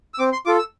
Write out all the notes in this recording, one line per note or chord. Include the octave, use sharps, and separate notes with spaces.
E6
C4 D6
C6
F4 A4 D6
E6